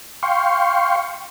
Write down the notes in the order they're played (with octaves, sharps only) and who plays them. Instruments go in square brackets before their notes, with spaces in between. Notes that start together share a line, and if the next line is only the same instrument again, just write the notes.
[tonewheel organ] F5 G5 C6 C#6